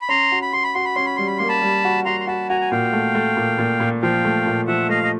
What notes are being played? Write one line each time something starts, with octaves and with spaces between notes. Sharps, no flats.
B5
C#4 A#5 C6
F#4
B5
F#4 C6
B5
F#4 C6
B5
C#4 C6
B5
G3 C6
B5
A#3 C6
A5 B5
G3
F#4
F#4 A#5 C6
C6
F#4 A5 B5
F#4 G#5 A#5
G#5
A#2 F5 G5
A3
A3
A#2
A#2
A#2
F3 F5 G5
A3
A#2
F3 E5 F#5
A3 D#5 F5
D#5